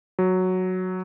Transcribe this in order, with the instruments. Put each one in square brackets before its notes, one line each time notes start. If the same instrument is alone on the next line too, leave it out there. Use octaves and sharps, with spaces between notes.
[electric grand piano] F#3